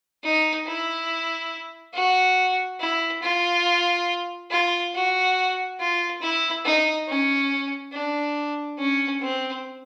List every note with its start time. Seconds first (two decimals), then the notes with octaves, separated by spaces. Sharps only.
0.24 D#4
0.66 E4
1.94 F#4
2.80 E4
3.22 F4
4.50 F4
4.94 F#4
5.79 F4
6.21 E4
6.65 D#4
7.08 C#4
7.92 D4
8.78 C#4
9.21 C4